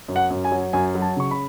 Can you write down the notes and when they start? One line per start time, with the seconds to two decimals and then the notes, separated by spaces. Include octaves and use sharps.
0.08 F#2
0.16 F#5
0.30 F#2
0.45 G#5
0.52 F#3
0.73 F#2 G#5
0.95 F#3
1.02 A5
1.16 C#3 C#6
1.31 B5